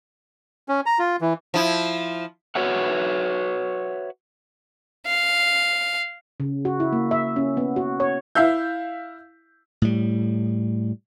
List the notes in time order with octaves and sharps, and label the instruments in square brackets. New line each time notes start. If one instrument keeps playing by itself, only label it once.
[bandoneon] C#4
A#5
F4
E3
[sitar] F3 E4
[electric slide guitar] F#4 B4 C#5 E5 F#5
[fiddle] F5
[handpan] C#3
F#4
E4
A#3
E5
C#4
B3
F#4
C#5
[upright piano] E4 E5 F5 E6 G6
[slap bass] A2 G3